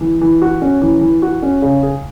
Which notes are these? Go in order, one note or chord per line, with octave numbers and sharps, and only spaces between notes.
E3
E3
F#4
C#4
E3
E3
F#4
C#4
C#3
G#4